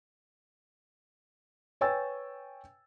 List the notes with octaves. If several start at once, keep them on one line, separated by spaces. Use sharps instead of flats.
B4 C#5 G5 G#5 E6 A6